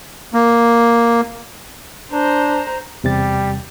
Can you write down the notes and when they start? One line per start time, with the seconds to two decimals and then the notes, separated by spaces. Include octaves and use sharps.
0.33 A#3
2.12 D4 C5 A#5
3.04 E2 C3 G3 A6